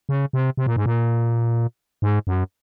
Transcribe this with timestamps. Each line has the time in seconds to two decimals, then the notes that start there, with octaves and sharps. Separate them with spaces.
0.09 C#3
0.33 C3
0.57 C3
0.66 A#2
0.76 G#2
0.86 A#2
2.02 G#2
2.27 F#2